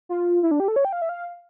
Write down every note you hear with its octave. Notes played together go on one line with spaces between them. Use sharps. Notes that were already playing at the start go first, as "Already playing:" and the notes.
F4
E4
D4
G4
A4
C#5
G5
F5
E5
F5